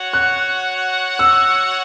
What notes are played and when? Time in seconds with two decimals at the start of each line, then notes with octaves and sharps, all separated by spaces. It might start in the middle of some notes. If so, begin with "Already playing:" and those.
Already playing: F#4 C#5 F#5
0.13 F#6
1.19 E6